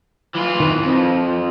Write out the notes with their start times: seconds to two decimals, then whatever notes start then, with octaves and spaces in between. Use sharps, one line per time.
0.35 E3 F4
0.60 D#3 B4
0.83 F2 F3